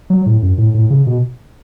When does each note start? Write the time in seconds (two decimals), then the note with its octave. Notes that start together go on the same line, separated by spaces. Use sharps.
0.10 F#3
0.26 A2
0.42 F#2
0.58 A2
0.74 A2
0.90 C#3
1.07 B2